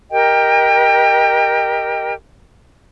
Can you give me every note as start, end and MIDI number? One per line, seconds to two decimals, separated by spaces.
0.11 2.13 67
0.11 2.13 70
0.11 2.13 75
0.11 2.13 79